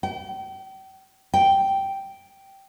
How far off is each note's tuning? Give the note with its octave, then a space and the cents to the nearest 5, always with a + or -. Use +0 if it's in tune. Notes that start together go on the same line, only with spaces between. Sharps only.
G5 -35
G5 -5